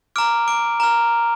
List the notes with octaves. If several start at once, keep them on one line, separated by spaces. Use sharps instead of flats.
A#5 D6 F6 D7
D6 D7
A#5 F6